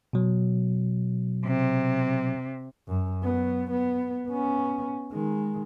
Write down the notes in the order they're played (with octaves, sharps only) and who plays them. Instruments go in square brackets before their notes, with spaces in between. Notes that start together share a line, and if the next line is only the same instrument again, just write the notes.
[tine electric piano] B2 F#3
[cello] C3
[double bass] F#2
F#3 B3
B3
B3 C#4
D#3 G#3